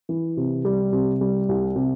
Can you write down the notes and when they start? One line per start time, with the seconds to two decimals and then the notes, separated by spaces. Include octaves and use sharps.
0.09 E3
0.37 C3
0.65 G3
0.93 C3
1.21 G3
1.49 C2
1.76 C3